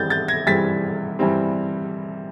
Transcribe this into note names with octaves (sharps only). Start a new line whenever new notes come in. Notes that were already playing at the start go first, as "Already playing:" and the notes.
Already playing: G2 E3 G3 C4 G6 A6
G6 A6
G#6 A#6
G2 E3 G3 C4 A6 B6
G2 E3 G3 C4